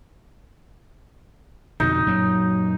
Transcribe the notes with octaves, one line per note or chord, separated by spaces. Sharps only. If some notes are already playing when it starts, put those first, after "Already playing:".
F2 B2 D3 D#4
F#2 A#2 F#3